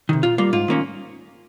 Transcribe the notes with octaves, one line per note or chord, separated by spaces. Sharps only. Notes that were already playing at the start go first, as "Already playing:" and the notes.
C3 D#3
A#2 F4
G3 A#3 F4
G#2 F4
D#3 A#3 C#4